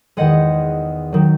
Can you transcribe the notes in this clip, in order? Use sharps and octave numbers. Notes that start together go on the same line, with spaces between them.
E2 D#3 G#3 D#5 F#5
D#3 F#3